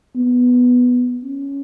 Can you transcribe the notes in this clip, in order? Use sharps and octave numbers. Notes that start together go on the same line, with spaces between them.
B3
C#4